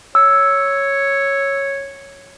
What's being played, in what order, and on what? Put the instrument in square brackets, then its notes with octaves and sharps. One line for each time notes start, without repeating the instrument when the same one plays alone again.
[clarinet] C#5 [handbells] E6